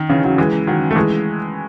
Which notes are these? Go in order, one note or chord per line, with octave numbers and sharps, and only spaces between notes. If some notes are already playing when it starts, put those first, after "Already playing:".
Already playing: D#3
C#3 E3
D#3 F#3
E3 G#3
D#3 F#3
A3
E3 G#3